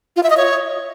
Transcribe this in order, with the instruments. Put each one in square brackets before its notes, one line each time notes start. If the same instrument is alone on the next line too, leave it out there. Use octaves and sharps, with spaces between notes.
[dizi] F4
E5
D#5
C#5